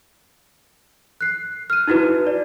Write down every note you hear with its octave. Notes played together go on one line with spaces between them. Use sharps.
F#6 C7
F6 D#7
D#4 E4 F#4 B4
D5